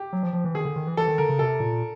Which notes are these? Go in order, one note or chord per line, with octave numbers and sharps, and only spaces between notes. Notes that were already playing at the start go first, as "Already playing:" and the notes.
Already playing: G4
F#3
F3
F3
E3
D#3 G#4
D3
D#3
E3
E3 A4
D#3
D3 A#4
C#3
C3 A4
A#2